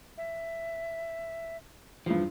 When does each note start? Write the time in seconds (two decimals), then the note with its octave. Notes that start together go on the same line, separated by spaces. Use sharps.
0.18 E5
2.06 E2 G2 F3